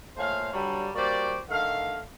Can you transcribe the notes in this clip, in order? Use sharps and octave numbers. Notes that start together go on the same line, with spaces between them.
A#2 A3 C5 C#5 F5
G2 D3 F#3 G3
G3 A#3 F#4 C5 D5
D3 D#3 A3 F5